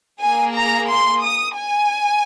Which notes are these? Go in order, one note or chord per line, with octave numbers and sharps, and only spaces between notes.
A#3 G#4 G#5
A#5
C6
D#6
G#5